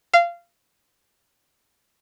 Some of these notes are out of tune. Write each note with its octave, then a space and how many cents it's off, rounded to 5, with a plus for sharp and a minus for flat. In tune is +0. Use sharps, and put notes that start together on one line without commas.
F5 -20